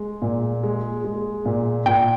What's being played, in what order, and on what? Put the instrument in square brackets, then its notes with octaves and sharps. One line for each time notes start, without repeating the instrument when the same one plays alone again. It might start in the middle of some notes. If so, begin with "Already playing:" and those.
Already playing: [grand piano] G#3
A#2
G#3
G#3
A#2
[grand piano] A#2 [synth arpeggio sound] G5